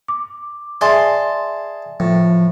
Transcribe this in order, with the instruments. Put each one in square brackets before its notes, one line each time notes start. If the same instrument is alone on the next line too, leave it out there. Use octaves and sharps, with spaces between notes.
[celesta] D6
[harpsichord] G#4 A5 [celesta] D5 E5 [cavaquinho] C6
[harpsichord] A2 [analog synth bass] F3